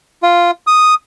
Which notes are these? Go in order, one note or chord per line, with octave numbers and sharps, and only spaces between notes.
F4
D#6